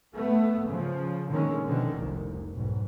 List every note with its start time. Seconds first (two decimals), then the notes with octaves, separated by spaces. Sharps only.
0.16 A3 B3
0.68 C#3 F3
1.29 A#2 D3 D#3 G#3 C#4
1.65 B2 D3 D#3 F3
1.96 F1 C2
2.53 B1 G#2